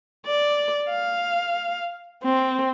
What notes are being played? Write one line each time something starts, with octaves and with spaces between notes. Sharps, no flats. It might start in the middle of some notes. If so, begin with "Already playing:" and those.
D5
F5
C4